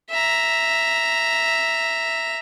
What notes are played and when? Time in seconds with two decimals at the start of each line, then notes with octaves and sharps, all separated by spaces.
0.10 E5 A#5